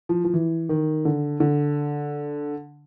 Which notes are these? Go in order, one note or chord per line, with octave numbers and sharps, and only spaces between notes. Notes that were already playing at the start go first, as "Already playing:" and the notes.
F3
F3
E3
D#3
D3
D3